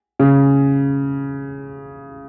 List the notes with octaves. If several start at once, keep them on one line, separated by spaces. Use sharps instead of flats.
C#3